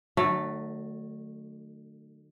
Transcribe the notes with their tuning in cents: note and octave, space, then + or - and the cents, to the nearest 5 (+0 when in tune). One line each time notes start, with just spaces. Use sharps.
D3 +45 F#3 +0 A3 +0